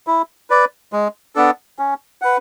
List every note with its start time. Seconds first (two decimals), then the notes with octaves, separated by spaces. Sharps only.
0.07 E4
0.50 B4 D5
0.93 G#3
1.36 B3 D4 A4
1.79 C#4
2.22 B4 F#5